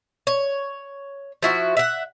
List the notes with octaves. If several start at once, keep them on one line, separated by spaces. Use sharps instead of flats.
C#5
F3 E4 F#4
E5 F#5